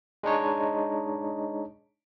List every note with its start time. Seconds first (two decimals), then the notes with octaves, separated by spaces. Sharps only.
0.23 G#3 D4 D#4 C#5